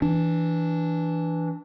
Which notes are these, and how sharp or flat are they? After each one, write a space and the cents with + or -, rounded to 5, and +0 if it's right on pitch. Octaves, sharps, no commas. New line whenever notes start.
E3 +0 D4 +0